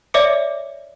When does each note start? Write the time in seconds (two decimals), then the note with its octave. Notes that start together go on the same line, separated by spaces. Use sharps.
0.14 C#5 D5 E5 D6 C#7